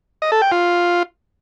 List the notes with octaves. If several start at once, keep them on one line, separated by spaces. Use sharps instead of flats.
D#5
A4
G5
F4